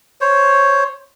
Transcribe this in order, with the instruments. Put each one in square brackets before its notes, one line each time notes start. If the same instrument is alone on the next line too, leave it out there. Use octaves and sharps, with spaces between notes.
[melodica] C5 C#5